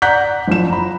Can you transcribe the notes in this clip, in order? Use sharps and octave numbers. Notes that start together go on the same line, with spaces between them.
D5 F#5 A#5 F#6 G6 B6
F#1 F3 E7
A#5 B5